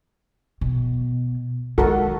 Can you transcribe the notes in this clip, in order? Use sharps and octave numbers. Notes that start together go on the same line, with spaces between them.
B2
D#3 G#3 F#4 A4 A#4